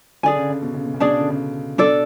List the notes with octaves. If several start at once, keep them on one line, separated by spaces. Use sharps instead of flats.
D3 G#4 D5 G#5
C#3
C#3
B2
C#3
B2
C#3
B2 D4 G#4 D5 A5
C#3
D3
C#3
B2 D4 A4 D5